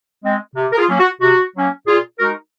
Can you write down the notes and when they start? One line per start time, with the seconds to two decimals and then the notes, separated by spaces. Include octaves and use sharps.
0.24 G#3 C4
0.56 C3
0.72 A#4
0.77 F4 G#4
0.89 F#3 A#3 C#4
1.00 F#4
1.21 C3 F#4
1.55 F#3 A#3 C#4
1.86 A#2 F4 G#4
2.19 G#3 D#4 F#4 A#4